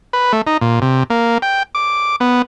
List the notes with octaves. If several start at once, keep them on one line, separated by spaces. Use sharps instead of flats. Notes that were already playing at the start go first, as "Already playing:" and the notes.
B4
A3
D#4
A#2
C3
A#3
G5
D6
B3